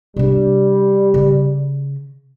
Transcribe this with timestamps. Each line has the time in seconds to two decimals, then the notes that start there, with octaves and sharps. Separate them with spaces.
0.16 C3 G3 D4
1.14 C#3